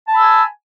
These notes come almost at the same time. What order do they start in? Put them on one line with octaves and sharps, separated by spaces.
A5 B5 E6 G#5